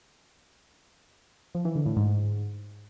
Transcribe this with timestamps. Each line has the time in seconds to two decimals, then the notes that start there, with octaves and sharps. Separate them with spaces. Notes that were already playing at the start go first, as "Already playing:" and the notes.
1.55 F3
1.65 E3
1.75 D3
1.86 A2
1.96 G#2